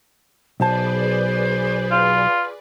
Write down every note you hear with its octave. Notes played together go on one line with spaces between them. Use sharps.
B1 G#4 B4 C5 D5 A5
F4